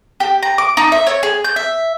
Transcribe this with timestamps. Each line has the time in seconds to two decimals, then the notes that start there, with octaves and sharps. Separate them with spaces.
0.20 G4
0.43 A#5
0.58 D6
0.77 D#4
0.92 E5
1.07 C#5
1.23 G#4
1.44 G6
1.56 E5